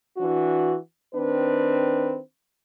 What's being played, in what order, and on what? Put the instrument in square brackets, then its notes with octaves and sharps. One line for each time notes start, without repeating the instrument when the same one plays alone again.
[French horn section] E3 D4 F#4
D#3 C4 D4 B4